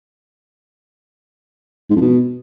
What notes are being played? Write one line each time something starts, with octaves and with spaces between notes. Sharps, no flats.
G#2
F2
B2